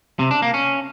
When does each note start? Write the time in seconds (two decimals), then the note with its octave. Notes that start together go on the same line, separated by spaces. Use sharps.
0.19 C3
0.31 D4
0.42 A#3
0.54 C#4